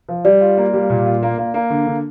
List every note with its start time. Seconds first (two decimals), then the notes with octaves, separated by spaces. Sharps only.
0.09 F3
0.25 G3 D5
0.41 F4
0.57 A#3
0.74 G3
0.90 A#2
1.06 F4
1.23 A#3
1.38 A#3
1.54 A#3
1.70 D3
1.87 D3